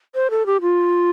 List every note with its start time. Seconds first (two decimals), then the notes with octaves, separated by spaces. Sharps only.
0.15 C5
0.30 A4
0.46 G4
0.61 F4